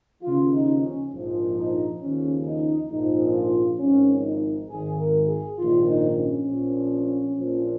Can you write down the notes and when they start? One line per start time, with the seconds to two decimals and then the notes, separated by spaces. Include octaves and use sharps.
0.22 D#2 C#3 F3 F4
0.52 D#4
0.82 C#4
1.12 A#1 G#2 F3
1.57 D#4
2.01 D#2 C#3 F3 C#4
2.46 D#4
2.90 A#1 G#2 F3 D#4
3.34 F4
3.79 G#1 G#2 F3 C#4
4.25 D#4
4.69 G#1 G#2 D#3 G#4
4.99 A#4
5.28 G#4
5.58 A#1 G#2 D#3 F4
5.88 D#4
6.18 C#4
6.47 A#1 A#2 F3
7.37 A#1 A#2 F3